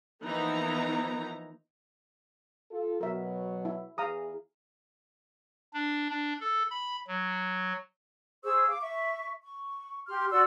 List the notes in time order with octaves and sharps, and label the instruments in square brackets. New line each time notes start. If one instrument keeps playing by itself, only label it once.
[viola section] E3 F3 A#3 B3 D#4 A#5
[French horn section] F4 A4
[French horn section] B2 F#3 [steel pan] A#4 E5
[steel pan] E4
[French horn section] E2 E3 G#4 [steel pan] F5 A#5 D#6
[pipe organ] D4
D4
A4
B5
F#3
[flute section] G#4 C5 C#6 E6
F5 D6
E5 C#6
C#6
G4 C6 F6
F#4 D5 C6 E6